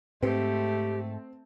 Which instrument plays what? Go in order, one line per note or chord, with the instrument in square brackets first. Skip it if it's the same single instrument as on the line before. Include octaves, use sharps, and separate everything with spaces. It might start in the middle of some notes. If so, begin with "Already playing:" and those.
[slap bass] G#2 [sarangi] A3 [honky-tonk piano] C4 [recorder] G4